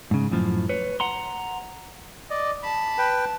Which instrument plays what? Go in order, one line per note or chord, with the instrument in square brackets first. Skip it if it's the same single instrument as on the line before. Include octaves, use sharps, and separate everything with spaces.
[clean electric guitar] G#2 C#3
F#2 A2 F3
B4 C#5
F#5 A#5 C6
[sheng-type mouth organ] D5 D#5
[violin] A5 [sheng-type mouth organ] B5
[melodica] B4 G5